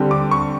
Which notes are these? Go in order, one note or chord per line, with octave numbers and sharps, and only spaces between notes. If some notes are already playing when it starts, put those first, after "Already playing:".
Already playing: D3 G3 C4
D6
C#6